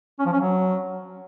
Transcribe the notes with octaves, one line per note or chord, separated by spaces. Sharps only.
C#4
F3
C#4
F#3